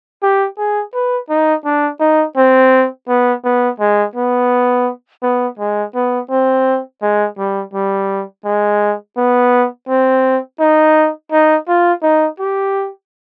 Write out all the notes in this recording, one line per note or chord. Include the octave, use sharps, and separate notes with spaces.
G4
G#4
B4
D#4
D4
D#4
C4
B3
B3
G#3
B3
B3
G#3
B3
C4
G#3
G3
G3
G#3
B3
C4
D#4
D#4
F4
D#4
G4